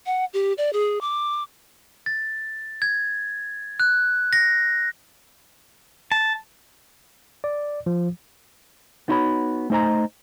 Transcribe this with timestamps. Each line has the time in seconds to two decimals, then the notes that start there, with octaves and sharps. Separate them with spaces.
0.06 F#5
0.33 G4
0.58 D5
0.73 G#4
1.01 D6
2.06 A6
2.82 G#6
3.80 F#6
4.33 A#6
6.12 A5
7.44 D5
7.86 F3
9.08 B3 D#4 E4 F#4 C#5 B5
9.70 A3 D#4 C5 D#5 A#5